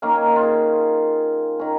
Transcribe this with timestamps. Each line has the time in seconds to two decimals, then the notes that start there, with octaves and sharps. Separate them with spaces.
0.02 D#3 A#3 C#4 F5
0.16 G#5
0.29 F5
0.36 F4
0.42 G#4
1.59 D#3 C#4